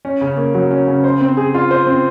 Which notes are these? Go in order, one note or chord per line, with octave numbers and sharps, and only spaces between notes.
C#4
C#3
A#3
F#3
C#4
C#3
C5
C4
G#4
F4
C5
C4